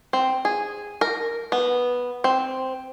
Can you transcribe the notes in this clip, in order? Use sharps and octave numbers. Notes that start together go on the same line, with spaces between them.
C4
G#4
A#4
B3
C4